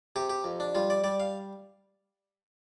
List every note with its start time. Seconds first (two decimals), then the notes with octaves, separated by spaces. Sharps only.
0.16 C3 G4
0.29 G4
0.44 F2
0.60 D4
0.75 G3 F4
0.90 D5
1.04 G3 D5
1.20 F5